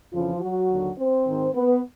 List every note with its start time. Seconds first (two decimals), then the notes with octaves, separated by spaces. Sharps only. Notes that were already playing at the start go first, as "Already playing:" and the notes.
0.13 F2 C#3 E3 F3 F4
0.41 F#3 F#4
0.70 D#2 D3
0.98 C4 C5
1.27 G#2 D#3
1.54 B3 B4